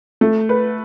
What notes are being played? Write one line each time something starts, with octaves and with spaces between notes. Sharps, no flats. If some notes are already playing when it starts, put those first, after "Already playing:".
A3
B4